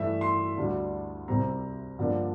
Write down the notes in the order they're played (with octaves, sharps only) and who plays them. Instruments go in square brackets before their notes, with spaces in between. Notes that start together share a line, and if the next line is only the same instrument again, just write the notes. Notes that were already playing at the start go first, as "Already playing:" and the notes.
Already playing: [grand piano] G2 E3 A3 E5
C6
D2 D3 G3 D4
C2 C3 G3 C4 A#5
G2 D3 F3 A#3 D4